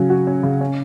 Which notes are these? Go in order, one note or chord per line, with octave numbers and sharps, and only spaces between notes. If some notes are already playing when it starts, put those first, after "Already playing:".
Already playing: C#3 F#3 C#4
F#4
C#4
C#3
C#4